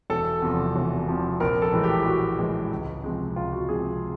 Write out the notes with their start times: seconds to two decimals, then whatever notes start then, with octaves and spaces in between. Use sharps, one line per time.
0.10 E1 A4
0.42 E2 C3 F3
0.76 E1
1.08 E2 C3 F3
1.40 A#1 A#4
1.62 A4
1.73 A2 E3 G#3
1.83 G4
2.06 A#1 F#4
2.39 A2 E3 G#3
2.72 C#2
3.04 C3 F3 G#3
3.36 C#2 F4
3.53 F#4
3.69 C3 F3 G#3 G#4